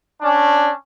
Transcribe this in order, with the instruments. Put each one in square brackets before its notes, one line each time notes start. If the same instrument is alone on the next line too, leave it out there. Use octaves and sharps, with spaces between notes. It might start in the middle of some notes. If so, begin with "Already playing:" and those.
[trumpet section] C#4 D4